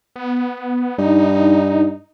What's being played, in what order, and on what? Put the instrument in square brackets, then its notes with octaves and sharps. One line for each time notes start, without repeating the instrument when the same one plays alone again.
[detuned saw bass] B3
[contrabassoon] G2 [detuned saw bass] D#4